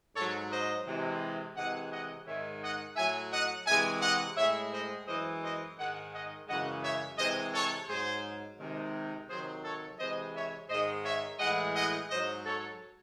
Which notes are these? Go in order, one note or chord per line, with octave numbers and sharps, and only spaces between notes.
G#2 F#3 A4 C#5
C5 D#5
C3 E3 G#3
C3 E3 G#3 D#5 F#5
D#5 F#5
G#2 D#3 G#3 C#5 E5
D#5 F#5
A2 F#3 E5 G#5
D#5 F#5
C3 E3 G#3 E5 G#5
D#5 F#5
A2 G#3 C#5 E5
C5 D#5
F#2 E3 G#3 C5 D#5
C5 D#5
G#2 D#3 G#3 D#5 F#5
D#5 F#5
F#2 C#3 E3 G#3 D#5 F#5
C#5 E5
C3 E3 G#3 C5 D#5
A4 C#5
G#2 F#3 G#4 C5
C3 D#3 G#3
C3 D#3 F#3 G#4 C5
A4 C#5
C3 E3 G#3 C5 D#5
C#5 E5
G#2 D#3 G#3 C5 D#5
C#5 E5
A2 E3 G#3 D#5 F#5
D#5 F#5
G#2 F#3 C5 D#5
A4 C#5